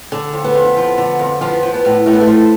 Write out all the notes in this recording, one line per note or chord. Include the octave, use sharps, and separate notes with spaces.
D3
F2
B3
F2
F3
D3
F2
F3 B3
F3
B3
A2
A2 A3
B3
A3
F3